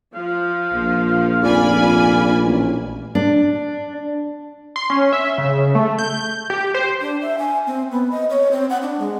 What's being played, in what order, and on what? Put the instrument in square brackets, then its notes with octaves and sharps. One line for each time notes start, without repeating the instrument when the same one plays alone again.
[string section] F3 [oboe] F5
[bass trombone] A#1
[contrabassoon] F1 [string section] D5 G#5 B5
[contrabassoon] A1
[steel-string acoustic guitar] D4
[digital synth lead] C6
C#4
E5
C#3
A3
G6
G4
C5
[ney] D4
E5
G#5
C4
B3
D#5
C#5
C4
F#5
D4
G#3